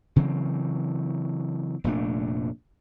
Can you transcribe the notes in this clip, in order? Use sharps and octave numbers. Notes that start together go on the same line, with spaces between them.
C#3 E3 F#3 C4
F1 A#2 A3 D4